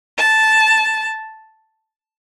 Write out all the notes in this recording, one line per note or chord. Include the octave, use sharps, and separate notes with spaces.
A5